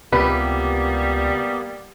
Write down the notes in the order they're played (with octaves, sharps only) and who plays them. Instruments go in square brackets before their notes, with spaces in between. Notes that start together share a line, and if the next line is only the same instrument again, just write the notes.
[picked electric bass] C#2 C3 [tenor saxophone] G3 [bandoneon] A#3 B3 [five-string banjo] B4